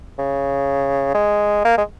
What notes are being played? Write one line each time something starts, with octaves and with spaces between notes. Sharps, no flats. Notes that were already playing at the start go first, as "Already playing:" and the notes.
C#3
G#3
A#3
G#3